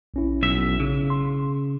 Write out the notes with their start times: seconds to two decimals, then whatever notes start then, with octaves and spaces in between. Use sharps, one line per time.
0.14 A#1 C#4 E4
0.43 B1 E5
0.80 C#3
1.10 C6